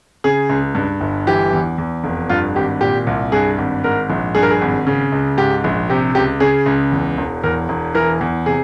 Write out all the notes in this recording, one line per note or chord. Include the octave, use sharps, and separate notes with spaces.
C#3 G#4
C#2
G2
G1
E3 G4
E2
E2
F1
G2 F4
G#1 G4
A#2 G4
C2
G2 G#4
G#1
G#2 A#4
A#1
G2 G#4
A#4
G#4
G#1
C#3
C#2
G#2 G4
A#1
C3 G4
C#2 G4
C#3 G#4
C#2
E2
E1
E2 A#4
E1
E3 A#4
E2
C3 G#4